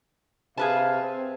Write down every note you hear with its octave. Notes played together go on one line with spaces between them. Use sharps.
C3 G#4 B4 F5 A5
C4